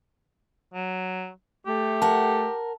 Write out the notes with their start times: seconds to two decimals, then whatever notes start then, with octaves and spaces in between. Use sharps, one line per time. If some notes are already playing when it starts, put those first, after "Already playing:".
0.74 F#3
1.66 A3 G4
2.02 A#4 F#5 A5